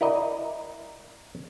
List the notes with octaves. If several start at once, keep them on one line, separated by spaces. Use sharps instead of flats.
E4 A#4 D5 D#5